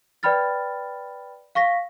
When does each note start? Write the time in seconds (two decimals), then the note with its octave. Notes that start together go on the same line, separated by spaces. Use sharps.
0.23 B4 D5 G5 B5 F6 A6
1.55 F5 C#6 A#6 B6